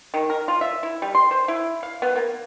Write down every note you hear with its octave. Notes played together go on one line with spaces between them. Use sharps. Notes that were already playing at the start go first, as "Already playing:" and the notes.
D#3
A#4
F4
E5
E4
G3
C6
C5
E4
F5
B3
A#3